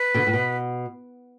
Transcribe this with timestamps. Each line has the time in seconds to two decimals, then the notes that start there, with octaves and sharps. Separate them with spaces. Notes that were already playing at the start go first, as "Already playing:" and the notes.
Already playing: B4
0.14 B2 D3
0.27 A2
0.33 B2